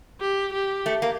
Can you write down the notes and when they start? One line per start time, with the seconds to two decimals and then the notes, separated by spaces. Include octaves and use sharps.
0.21 G4
0.53 G4
0.86 A3
1.02 A#3